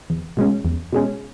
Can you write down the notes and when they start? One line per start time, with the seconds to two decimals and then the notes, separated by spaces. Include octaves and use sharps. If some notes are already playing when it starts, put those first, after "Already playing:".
0.10 E2
0.37 B2 G#3 C#4
0.65 E2
0.93 B2 G#3 C#4